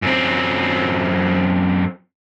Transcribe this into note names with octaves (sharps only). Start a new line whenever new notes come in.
F#2 C4